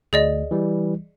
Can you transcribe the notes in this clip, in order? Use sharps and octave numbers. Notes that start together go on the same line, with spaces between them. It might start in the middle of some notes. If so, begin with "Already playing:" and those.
D2 G#4 D5 D#5
E3 G3